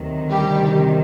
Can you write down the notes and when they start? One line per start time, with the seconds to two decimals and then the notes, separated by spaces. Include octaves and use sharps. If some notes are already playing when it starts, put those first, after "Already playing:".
Already playing: D2 C3 D#3 F#3
0.29 G3 G4